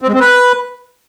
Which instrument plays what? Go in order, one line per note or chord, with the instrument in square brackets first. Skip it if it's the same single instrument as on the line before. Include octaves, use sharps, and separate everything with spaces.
[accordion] C4
G#3
C4
B4